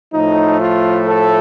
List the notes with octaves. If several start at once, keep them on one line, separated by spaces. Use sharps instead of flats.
A2 F3 A3 D#4
F4
A4